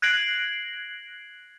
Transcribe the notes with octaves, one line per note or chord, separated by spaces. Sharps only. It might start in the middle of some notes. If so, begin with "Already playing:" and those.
F#6 G#6 A#6 C7 D7 F#7